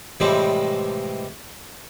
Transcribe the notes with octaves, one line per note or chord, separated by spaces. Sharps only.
A2 C3 E3 F3 G3 G#3